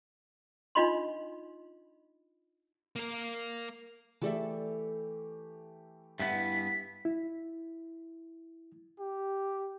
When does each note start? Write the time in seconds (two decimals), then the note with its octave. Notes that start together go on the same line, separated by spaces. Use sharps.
0.75 D4 D#4 F4 D#5 B5 C6
2.96 A#3 A#4
4.22 E3 A3 G4 A4 D5 E5
6.19 G2 B3 E4 B6
7.05 E4
8.99 G4